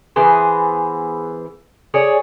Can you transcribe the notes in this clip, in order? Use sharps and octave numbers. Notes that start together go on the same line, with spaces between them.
E3 B3 G#4 C5
G#4 C#5 D5